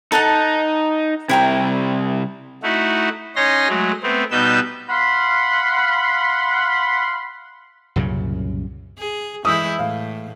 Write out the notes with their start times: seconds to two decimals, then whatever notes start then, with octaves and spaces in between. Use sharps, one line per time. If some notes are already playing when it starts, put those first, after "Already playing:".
0.12 D#4 A4 F#5 A5
1.29 C3 G3 E4 G5 A#5
2.63 A3 D#4 E4 F#4
3.36 C#4 D#4 C#5 C6 A#6
3.69 F#3 G#3 A3
4.03 A3 B3 C4
4.31 B2 G3 D#4 B4 E6 G6
4.89 F5 F#5 B5 C6
7.96 C2 F#2 A#2 C#3
8.98 G#4
9.45 E3 G#3 E4 D#6 E6 G6
9.79 A2 F5